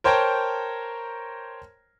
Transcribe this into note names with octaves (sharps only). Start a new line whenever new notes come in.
A#4 C5 C#5 G5 A5 A#5